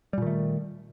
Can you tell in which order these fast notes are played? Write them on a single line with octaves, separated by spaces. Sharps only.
G3 A#2 D#3 A3